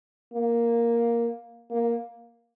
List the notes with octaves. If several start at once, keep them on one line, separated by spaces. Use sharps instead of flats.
A#3
A#3